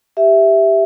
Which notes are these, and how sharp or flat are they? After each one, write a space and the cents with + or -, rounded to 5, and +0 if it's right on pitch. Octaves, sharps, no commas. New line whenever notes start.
G4 +5 E5 +0